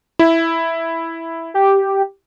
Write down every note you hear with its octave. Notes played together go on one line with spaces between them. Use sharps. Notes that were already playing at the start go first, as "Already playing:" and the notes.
E4
G4